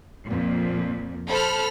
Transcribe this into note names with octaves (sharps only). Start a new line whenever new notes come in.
F2 A#2
A4 C5 B5 F6